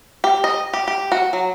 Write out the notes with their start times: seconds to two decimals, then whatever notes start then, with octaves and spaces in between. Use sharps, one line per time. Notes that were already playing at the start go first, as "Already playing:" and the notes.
0.24 G4
0.44 D#5
0.73 G4
0.88 G4
1.12 F#4
1.33 F#3